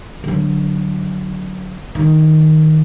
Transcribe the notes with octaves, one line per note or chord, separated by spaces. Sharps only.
D3 F#3
D#3